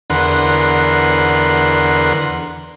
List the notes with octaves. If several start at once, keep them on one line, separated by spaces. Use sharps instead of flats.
E2 D3 A#4 B4 F#5 C6